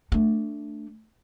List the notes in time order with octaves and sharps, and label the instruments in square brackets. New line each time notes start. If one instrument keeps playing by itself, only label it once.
[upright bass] A3 D4